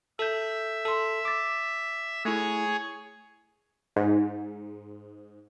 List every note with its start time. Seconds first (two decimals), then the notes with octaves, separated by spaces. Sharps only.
0.19 A4 E5 G6
0.85 A4 C6
1.25 D6 A6
2.25 A3 E4 G#4 C#5
3.96 G#2